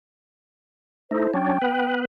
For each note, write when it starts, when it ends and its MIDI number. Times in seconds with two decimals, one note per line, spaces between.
1.11 1.27 57
1.11 1.27 63
1.11 1.30 64
1.11 1.30 69
1.11 1.30 72
1.34 1.58 54
1.34 1.58 61
1.34 1.58 62
1.34 1.93 79
1.62 2.05 59
1.62 2.05 71